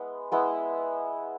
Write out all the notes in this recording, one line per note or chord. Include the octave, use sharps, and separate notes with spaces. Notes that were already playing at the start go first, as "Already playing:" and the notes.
Already playing: G#3 B3 E4
G#3 B3 E4